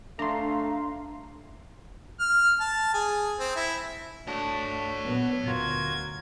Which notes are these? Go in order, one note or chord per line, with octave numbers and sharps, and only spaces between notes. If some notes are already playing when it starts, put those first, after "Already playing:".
A3 D4 F5 A#5 C6
F6
A5
G#4
C4
E4
A3 D4 F#4 C#5 A5
A#2 F#3 B3
D2 F4 F#4 A#4 G#6